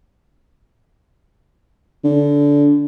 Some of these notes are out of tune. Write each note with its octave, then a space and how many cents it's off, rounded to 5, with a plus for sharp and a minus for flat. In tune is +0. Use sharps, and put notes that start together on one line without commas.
D3 -20